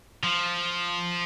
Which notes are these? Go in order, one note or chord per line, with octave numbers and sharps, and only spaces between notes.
F3